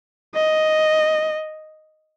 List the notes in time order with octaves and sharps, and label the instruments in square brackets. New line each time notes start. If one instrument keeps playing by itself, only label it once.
[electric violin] D#5